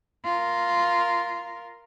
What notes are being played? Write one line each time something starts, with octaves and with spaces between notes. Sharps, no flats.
F4 A#4